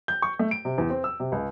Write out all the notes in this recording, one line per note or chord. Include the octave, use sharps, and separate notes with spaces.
G6
C#6
A3
D7
C3
E2
C4
E6
C3
C#2